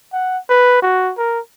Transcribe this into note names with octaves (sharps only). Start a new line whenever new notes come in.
F#5
B4
F#4
A#4